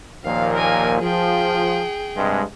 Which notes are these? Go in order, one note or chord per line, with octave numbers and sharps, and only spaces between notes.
D#2 A#2 F3 F5
A#4 G#5
F3 G#4 G5
G2 C3 G#3